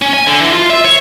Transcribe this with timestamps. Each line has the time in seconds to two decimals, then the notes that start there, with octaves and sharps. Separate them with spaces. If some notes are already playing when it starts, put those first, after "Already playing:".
0.02 C#4
0.14 G#5
0.27 D3
0.41 E3
0.53 F4
0.70 E5
0.85 C#5